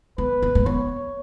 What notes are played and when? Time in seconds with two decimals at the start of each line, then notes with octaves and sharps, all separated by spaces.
0.18 B3 B4
0.42 B3
0.55 A#3
0.66 B3 C#5